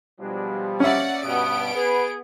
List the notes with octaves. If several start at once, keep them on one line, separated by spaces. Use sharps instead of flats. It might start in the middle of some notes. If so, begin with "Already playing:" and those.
B2 F3 G3 G#3 D4
A#3 C#4 D5 E5 F#5
G2 B2 B3 F#5 D#6 D7
G#4 B4